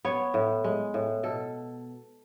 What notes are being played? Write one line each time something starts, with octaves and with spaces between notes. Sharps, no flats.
B3 C#5
A2
G#3
A2
B2 A4